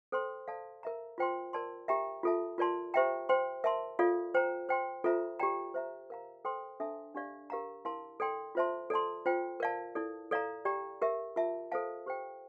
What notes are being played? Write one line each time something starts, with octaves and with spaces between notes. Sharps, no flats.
A4 C5 G5 C6
A4 D5 F5 A5
A#4 E5 A#5
F4 C5 G5 C6
A#4 D5 A5 C6
G4 A#4 E5 G5 A#5
F4 A4 E5 A5
F4 A#4 D5 A5 C6
G4 C5 E5 G5 A#5
C5 G5 C6
A#4 E5 A5 C6
F4 A4 D5 F5
C5 G5 A#5
C5 G5 C6
F4 A4 C5 E5 A#5
G4 D5 G5 A#5
C5 E5 A#5
A#4 F5 A#5
A4 C5 G5 C6
D4 A4 E5 A5
D4 G4 D5 F5
G4 A#4 F5 A#5
E4 A#4 F5 A5 C6
A4 D5 G5 C6
F4 C5 E5 A5 C6
A4 D5 A5 C6
F4 C5 G5
A#4 D5 F5 A5
E4 A4 D5
A4 D5 F5 A#5
G4 D5 G5 A#5
G4 A#4 E5
F4 A#4 E5 A5
A4 C5 F5 A5
G4 C5 G5